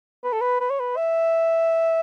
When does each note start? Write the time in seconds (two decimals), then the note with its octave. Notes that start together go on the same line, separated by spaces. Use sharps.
0.24 B4
0.33 A4
0.41 B4
0.61 B4
0.70 C#5
0.80 B4
0.97 E5